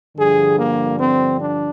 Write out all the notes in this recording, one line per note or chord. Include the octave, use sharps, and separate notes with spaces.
G2 D3 F3 G#4
A#3
C4
D4